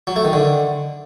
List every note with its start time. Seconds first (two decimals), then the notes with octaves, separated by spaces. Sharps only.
0.07 F#3
0.16 A3
0.25 D#3
0.33 D3